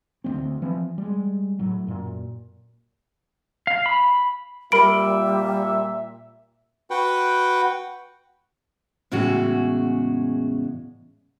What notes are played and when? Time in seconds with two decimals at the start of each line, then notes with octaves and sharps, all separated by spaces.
0.24 D2 G#3 C4
0.62 E3 F3 C4
0.98 G3 G#3
1.59 A2 F#3
1.87 F#2 A#2
3.67 F5
3.86 B5
4.72 A#2 G3 A#4 E5 B5 D7
6.90 F#4 B4 F#5 G5
9.12 E2 A2 C#3 G#3 F#4